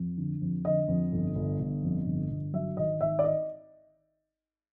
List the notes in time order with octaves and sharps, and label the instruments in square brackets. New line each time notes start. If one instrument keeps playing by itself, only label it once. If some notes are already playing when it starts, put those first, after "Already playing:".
Already playing: [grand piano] F2
D3
F2
D3 D#5
F2
G1
G1
G1
F2
G1
G1
F#3 E5
G#1 D#5
G#1 E5
D5
D#5